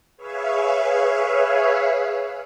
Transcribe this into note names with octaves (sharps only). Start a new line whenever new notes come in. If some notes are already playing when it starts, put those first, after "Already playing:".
G#4 B4 C#5 E5 F5